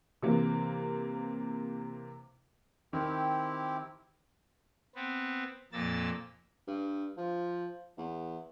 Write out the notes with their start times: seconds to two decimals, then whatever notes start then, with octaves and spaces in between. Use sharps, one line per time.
0.23 C3 E3 A#3
2.93 D#3 C4 E4 G4
4.95 B3 C4
5.73 F2 A#2 A#3 E6 A6
6.67 G2
7.17 F3
7.98 E2